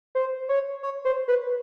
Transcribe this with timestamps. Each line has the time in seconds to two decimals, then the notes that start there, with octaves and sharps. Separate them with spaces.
0.15 C5
0.49 C#5
0.83 C#5
1.05 C5
1.28 B4